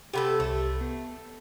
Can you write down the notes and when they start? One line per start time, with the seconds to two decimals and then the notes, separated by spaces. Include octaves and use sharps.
0.13 C3 A3 G4 A4 F#5 B5
0.40 C2 A3
0.81 B3